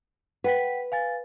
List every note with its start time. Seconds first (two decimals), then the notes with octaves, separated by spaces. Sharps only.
0.44 B4 F#5 G5 B6
0.92 F5 G#5 A6